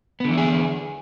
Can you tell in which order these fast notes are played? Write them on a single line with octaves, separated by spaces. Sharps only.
B3 D3 E3 E4 G#4